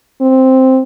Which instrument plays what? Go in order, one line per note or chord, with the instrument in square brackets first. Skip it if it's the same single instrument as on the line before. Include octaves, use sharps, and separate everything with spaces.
[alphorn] C4